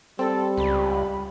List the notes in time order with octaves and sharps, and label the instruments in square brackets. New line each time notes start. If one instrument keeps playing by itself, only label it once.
[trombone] G3 [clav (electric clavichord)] C4 [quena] A4
[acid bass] C#2 [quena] B5